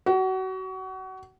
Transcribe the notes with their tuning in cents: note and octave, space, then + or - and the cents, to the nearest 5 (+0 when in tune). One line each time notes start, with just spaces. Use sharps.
F#4 +30